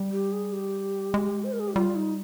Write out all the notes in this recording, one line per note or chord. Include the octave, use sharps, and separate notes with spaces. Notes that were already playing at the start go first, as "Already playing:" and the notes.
Already playing: G3
G4
G#4
G4
G#3
C5
A#4
G#4
G4
G3 F4
D#4